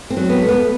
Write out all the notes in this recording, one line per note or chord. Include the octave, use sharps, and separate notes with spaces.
C4
F#3
B3
A3
B3